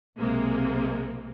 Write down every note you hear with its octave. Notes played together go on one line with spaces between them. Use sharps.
B1 C3 G#3 A#3